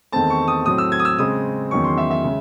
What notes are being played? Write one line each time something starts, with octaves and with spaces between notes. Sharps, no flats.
E2 D#3 A3 C4 A5
C#6
D#6
A2 F#3 C4 D#6
E6
G#6
D#6
E6
C#3 G#3 C4 D#6
E2 D#3 F#3 C#4 C#6
C6
E5
E5
C#3 G#3 C#4